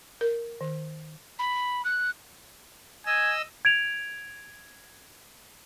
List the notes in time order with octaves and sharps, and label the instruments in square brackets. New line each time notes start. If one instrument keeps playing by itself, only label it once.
[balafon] A#4
D#3
[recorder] B5
F#6
[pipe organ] D#5 E6 [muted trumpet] G#5
[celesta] G#6 D7 F7